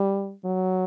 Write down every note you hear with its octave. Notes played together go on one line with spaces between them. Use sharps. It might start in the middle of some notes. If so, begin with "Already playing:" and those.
Already playing: G3
F#3